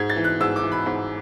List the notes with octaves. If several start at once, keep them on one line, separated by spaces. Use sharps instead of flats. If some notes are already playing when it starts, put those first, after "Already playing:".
Already playing: G#2 G#6
A6
E3
F#6
G#2 E6
D6
E3
B5
G#2